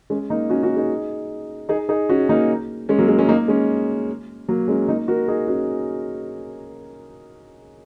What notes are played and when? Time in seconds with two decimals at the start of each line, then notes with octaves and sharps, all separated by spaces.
0.10 G#3 C#4
0.30 A#3 D#4
0.50 C#4 F#4
0.63 C#4 F#4
0.76 D#4 G#4
1.69 D#4 G#4
1.89 D#4 G#4
2.09 C#4 F#4
2.29 A#3 D#4
2.89 G#3 C#4
2.99 F#3 A#3
3.08 G#3 C#4
3.19 G#3 C#4
3.28 A#3 D#4
3.48 G#3 C#4
4.49 F#3 A#3
4.68 G#3 C#4
4.88 A#3 D#4
5.08 F#4 A#4
5.28 D#4 G#4
5.48 C#4 F#4